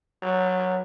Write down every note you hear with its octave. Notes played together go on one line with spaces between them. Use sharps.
F#3